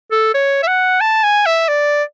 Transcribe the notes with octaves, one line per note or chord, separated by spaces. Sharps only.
A4
C#5
E5
F#5
A5
G#5
E5
D5